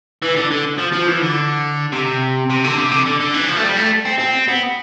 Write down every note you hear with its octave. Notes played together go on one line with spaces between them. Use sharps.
E3
D3
D3
F3
F3
E3
D3
C3
C3
D3
C3
D3
D3
D3
E3
F3
A3
G3
A3
C4
C4
B3